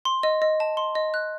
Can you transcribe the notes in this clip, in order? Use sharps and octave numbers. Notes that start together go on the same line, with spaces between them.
C6
D#5
D#5
A5
C6
D#5
F#6